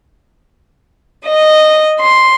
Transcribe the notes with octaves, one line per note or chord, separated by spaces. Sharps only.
D#5
C6